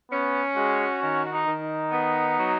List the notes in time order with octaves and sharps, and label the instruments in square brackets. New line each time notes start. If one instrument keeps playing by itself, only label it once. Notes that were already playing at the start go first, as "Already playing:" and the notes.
[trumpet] B3 [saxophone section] C#4
[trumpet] G#3 [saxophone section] F#4
[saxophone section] D#3 [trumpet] C#4
[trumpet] D#4
[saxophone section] D#3
[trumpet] D#4
[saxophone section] B3
F#3